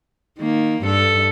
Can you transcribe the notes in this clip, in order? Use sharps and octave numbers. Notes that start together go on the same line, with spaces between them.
D#3 A#3
G2 A4